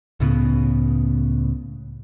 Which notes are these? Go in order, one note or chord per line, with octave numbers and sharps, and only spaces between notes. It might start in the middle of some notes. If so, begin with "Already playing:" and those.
C#2 A2 C#3 B3